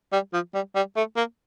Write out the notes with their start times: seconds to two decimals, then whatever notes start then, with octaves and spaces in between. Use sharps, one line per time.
0.13 G3
0.34 F3
0.54 G3
0.75 G3
0.96 A3
1.17 A#3